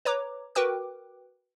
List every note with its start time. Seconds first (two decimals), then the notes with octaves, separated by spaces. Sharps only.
0.05 B4 C#5 A#5 D6
0.55 F#4 A#4 B4 G5 D6 F#6